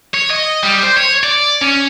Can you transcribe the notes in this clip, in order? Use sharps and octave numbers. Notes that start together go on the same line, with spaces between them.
C#5
D#5
G3
C5
C#5
D5
C#4